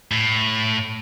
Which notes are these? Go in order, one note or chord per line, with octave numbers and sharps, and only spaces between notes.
A2